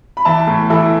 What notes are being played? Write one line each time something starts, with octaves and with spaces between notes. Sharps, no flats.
B5
E3 E5 A5
A2
E3 E4 A4